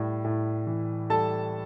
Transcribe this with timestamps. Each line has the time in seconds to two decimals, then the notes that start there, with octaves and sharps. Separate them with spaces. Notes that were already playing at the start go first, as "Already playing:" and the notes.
Already playing: A2 G3
0.24 A2
0.67 E3
1.10 G3 A4 A5